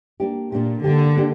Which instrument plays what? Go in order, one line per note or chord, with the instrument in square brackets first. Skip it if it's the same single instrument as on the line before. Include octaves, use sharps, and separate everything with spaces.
[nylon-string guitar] A#3 D4 G4
[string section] A#2 [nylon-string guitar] A#3 D4 G4
[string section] D3 [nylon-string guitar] A#3 D4 G4
[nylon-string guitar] A#3 D4 G4